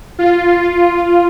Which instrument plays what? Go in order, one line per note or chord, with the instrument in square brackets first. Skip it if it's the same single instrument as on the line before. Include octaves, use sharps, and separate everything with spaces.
[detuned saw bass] F4